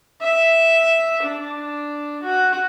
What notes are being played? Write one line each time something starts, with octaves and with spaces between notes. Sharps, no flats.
E5
D4
F#4